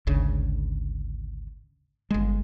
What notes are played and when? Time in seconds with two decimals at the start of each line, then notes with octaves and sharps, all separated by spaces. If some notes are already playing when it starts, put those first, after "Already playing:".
0.07 G#1 D2 C#3
2.10 G1 G#3